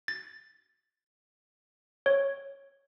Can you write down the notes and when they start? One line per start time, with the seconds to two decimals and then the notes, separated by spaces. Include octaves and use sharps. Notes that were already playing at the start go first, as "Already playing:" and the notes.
0.08 A6
2.06 C#5